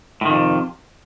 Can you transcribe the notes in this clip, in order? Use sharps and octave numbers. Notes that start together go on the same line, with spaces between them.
F2 A2 C3 D#3